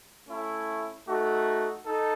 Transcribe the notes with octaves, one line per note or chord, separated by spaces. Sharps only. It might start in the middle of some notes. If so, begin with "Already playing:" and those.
A3 C#4 E4
A3 D#4 F#4
D#4 A4